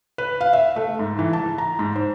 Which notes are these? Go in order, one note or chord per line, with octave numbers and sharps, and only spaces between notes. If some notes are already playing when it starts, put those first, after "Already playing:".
B4
F5
E5
A3
G#2
E3
A5
A#5
G#2
C5